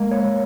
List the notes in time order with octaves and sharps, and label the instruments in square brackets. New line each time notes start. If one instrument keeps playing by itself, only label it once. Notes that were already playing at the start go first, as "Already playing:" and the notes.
Already playing: [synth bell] G#3 [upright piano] A#3
[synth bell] C#5